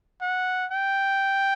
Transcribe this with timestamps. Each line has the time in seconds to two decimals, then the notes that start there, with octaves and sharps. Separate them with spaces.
0.22 F#5
0.72 G5